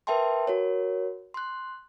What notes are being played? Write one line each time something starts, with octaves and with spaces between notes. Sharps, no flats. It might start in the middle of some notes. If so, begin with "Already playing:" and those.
A#4 B4 E5 G5 A5 C6
F#4 A#4 C#5
C6 F#6